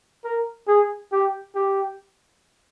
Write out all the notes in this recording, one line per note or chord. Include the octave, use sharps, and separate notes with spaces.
A#4
G#4
G4
G4